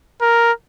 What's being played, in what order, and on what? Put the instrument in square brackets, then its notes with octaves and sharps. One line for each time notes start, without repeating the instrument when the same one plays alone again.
[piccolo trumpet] A#4